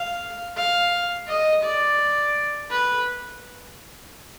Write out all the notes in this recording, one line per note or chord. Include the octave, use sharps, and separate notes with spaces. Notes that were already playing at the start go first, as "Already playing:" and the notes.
Already playing: F5
F5
D#5
D5
B4